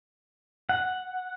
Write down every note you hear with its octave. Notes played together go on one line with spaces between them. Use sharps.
F#5